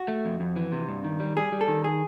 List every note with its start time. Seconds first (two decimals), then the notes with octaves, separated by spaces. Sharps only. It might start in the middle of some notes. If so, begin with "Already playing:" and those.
Already playing: F#4
0.08 A3
0.25 F2
0.40 F2
0.56 E3
0.72 C3
0.88 G2
1.04 D#3
1.20 G3
1.37 G3 G#4
1.52 G3
1.61 A4
1.68 D#3
1.84 G#4